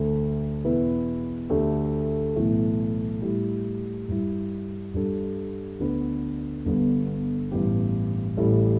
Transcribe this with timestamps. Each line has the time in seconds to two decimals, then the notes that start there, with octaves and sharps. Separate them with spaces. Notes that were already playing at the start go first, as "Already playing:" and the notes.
Already playing: D2 D3 A3
0.64 E2 B2 B3 E4 B4
1.50 D2 D3 A3 G4
2.36 B1 A2 E3 A3 E4
3.22 A2 G3 E4
4.08 G2 G3 E4
4.94 G2 G3 D4 A4
5.80 D2 D3 B3 D4 B4
6.65 G1 G2 D3 B3
7.52 A1 G2 E3 B3 G4
8.37 A1 A2 G3 E4 A4